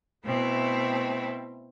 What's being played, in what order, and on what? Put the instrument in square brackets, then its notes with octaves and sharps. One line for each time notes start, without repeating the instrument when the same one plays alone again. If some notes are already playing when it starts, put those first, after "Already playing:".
[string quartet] B2 A3 C4 E4